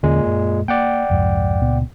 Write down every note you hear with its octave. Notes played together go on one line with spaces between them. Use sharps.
E2 A#2 D3 G#3 C#4
F#2
A#3 D5 F#5 G5
C2 F2 G#2
C#2 A#2 B3